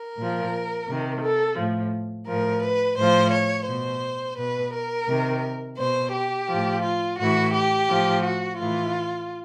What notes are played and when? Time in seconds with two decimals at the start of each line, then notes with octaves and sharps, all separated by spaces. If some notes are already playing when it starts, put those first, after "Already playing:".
Already playing: A#4
0.16 A#2 F3
0.87 C3 D#3
1.21 A4
1.56 A2 F3
2.27 A2 F3 A#4
2.63 B4
2.96 A2 F3 C5
3.32 C#5
3.67 B2 C5
4.37 B2 B4
4.73 A#4
5.08 C3 D#3
5.78 B2 C5
6.13 G4
6.48 A2 F3
6.83 F4
7.18 A2 E3 F#4
7.53 G4
7.88 A2 F3
8.24 F#4
8.59 A2 E3 F4